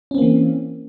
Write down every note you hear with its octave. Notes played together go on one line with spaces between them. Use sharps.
E3 A#3 C4 C#4